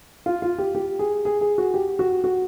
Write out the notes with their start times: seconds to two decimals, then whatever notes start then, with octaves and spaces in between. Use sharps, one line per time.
0.26 F4
0.42 F4
0.58 G4
0.75 G4
0.99 G#4
1.25 G#4
1.41 G#4
1.58 F#4
1.74 G4
1.99 F#4
2.24 F#4